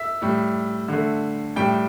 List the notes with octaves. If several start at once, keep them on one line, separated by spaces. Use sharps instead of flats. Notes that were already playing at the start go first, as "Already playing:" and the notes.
Already playing: E5
A2 G3
D3 A3
A2 G3 G5